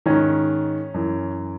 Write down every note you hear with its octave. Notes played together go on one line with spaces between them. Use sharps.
G#2 D#3 C#4
F#2 E3